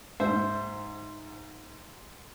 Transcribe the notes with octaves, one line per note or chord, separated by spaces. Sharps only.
G#2 C5 E5